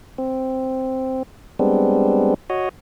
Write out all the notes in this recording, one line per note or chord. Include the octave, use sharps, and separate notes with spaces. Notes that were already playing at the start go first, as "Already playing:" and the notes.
C4
G3 G#3 B3 C4 D4
F#4 C#5 D#5